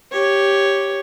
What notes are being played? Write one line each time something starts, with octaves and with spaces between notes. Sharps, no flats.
G4 C#5